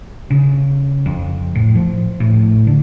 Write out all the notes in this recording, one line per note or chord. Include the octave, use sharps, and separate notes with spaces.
C#3
F2
A2
F3
A2
D3